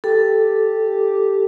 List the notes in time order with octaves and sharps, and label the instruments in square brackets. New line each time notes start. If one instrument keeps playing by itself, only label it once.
[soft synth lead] G4 [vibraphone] A4